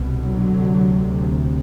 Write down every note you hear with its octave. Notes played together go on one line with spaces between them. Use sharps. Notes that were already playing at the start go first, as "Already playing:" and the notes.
Already playing: C2 B2
D3 F#3
D2 C3